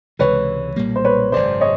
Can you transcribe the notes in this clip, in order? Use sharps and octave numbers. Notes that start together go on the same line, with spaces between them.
C#2 C3 E3 G#3 B4 C#5
B1 A#2 G3 A#3
C5
B4 C#5
G#1 F#2 C#3 C5 D5
C#5 D#5